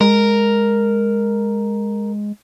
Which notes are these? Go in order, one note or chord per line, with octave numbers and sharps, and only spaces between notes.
G#3 A#4